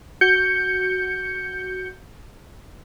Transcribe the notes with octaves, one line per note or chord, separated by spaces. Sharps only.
F#4 G6 C#7